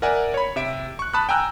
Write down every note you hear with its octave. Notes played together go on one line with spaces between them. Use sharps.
A#4 D5 E5 F#5 G#5
C#5 B5
C3 E5 D7
C#6 F#6
A5 B5 D#6 F#6
G5 G#5 A#5 E6 F#6 G6